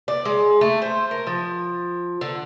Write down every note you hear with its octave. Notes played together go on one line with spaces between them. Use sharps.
D5
G#3
A3
C5
A#4
F3
D3